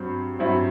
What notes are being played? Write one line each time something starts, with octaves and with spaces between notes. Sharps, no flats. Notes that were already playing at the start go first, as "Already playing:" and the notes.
Already playing: G2 F#3 C4
G2 F#3 C4 E4